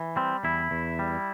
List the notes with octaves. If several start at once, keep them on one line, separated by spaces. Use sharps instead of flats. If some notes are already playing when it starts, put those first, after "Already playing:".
Already playing: E3
G3 C4
E2 E4
E2
G3